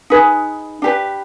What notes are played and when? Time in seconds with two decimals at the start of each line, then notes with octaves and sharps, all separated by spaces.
0.10 D#4 G#4 B4
0.82 D4 G4 B4